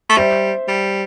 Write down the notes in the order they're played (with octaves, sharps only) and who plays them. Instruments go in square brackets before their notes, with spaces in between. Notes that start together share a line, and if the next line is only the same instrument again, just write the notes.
[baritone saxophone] A3
[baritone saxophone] G3 [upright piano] C5 E5
[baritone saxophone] G3